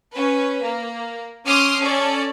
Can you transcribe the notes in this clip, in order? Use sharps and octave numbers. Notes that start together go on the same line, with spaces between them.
C#4 B4
A#3
C#4 C6 D6 D#6 F6 C7
C#4 A4 D5